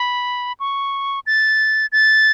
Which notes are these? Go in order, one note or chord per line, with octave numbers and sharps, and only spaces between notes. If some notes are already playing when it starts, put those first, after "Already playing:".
Already playing: B5
C#6
A6
A6